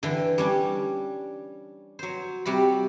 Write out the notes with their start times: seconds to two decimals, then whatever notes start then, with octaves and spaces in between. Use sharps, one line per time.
0.03 D3 E3 G5
0.38 G3 C#4 D4
1.99 F#3 C5
2.45 C3 G3 F#4 B5